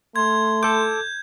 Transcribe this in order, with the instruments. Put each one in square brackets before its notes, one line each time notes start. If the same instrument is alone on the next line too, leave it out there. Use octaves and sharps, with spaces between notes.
[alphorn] A3 [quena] C6 [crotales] G#6
[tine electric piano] A4 D6 [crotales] G6